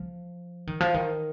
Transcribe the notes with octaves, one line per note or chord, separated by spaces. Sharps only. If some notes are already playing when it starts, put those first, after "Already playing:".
Already playing: F3
D#3
F3
D#3